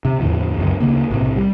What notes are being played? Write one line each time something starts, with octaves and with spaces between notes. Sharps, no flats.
C3
E2 A2 D3 F3
C#2 F#2
D2 C#3 A#3
B1 A2 C3
G3